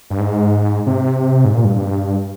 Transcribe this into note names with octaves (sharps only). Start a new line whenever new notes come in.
G2
G#2
C3
G#2
A#2
G2
G2